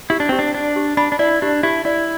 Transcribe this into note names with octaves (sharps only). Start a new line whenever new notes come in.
E4 G4
D4
C4 G4
D4
D4 D5
G4
D4 B5
D4
E4 D5
D4 G4
E4 G4
E4 D5